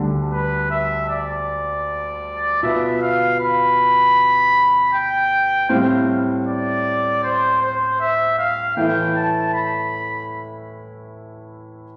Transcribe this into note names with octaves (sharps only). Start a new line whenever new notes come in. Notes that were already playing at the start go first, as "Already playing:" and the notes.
Already playing: D2 D3 G3 D4
B4
E5
D5
B2 B3 F4 E5
F5
B5
G5
A2 G3 C4 E4 F5
D5
C5
C5
E5
F5
A2 E3 A3 E4 G5
A5
B5